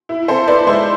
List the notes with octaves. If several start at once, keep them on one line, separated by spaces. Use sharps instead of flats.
E4
C4 A4 C5
E4 B4 D5
G#3 C5 E5